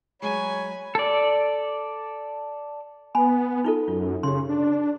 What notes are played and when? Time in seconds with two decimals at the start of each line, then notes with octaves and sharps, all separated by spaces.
0.22 F#3 G#3 C#5 G#5 B5
0.95 A4 D5
3.15 B3 G#5 B5
3.64 D#4 F4 A4
3.88 F#2 F4
4.23 C#3 G4 C6
4.49 D4